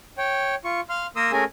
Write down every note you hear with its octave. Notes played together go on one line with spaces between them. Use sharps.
C#5 G5
F4 C#6
F5 C6 F6
A#3 A#4 C6 D#6 E6
A3 C#4 G#4 A#4 G#5